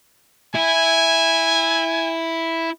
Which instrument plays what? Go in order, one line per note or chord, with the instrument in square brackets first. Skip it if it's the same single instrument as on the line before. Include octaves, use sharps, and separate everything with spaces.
[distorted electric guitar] E4 [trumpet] G#5